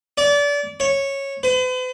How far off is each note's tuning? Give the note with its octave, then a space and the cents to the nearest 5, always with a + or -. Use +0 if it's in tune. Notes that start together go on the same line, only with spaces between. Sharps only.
D5 -30
C#5 -10
B4 +45